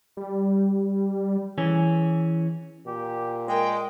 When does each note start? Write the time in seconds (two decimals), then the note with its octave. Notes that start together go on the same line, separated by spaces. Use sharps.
0.17 G3
1.58 E3 C#4 G#4
2.87 A#2 G4
3.48 G#3 A#4 G5